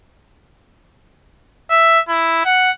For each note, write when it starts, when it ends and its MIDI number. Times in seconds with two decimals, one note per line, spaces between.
1.70 2.00 76
2.09 2.40 64
2.45 2.71 78